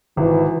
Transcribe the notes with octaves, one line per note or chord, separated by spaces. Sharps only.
G#1 E3